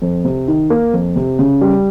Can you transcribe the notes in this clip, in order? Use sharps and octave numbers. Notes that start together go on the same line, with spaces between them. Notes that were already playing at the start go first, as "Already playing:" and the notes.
F2
C3
D#3
A#3
F2
C3
C#3
G3